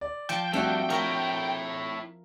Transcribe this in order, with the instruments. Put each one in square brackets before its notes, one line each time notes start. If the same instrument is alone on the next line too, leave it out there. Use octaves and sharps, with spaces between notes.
[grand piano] D5
[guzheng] F3 A5 [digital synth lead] G5
[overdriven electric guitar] G2 [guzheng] A3 [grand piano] C4 D4 F#4
[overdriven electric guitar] E4 C#5 [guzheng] A#4